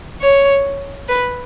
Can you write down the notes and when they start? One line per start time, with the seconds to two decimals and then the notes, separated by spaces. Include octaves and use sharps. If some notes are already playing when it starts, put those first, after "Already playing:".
0.21 C#5
1.08 B4